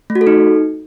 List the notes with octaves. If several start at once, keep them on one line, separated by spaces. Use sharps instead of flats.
A3
F#4
A4
D#4